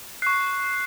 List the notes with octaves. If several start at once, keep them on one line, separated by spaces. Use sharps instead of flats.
C#6 F#6 C7